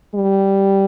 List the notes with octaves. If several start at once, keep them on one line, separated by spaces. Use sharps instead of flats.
G3